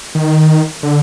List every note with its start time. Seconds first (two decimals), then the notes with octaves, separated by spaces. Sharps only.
0.15 D#3
0.83 D3